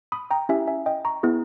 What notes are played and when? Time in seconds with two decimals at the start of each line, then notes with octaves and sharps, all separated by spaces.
0.12 B5 D#6
0.31 G5 A#5
0.49 C#4 E4 G4 E5 G#5
0.68 E5 G#5
0.86 D#5 G5
1.05 A#5 C#6
1.23 B3 E4 G#4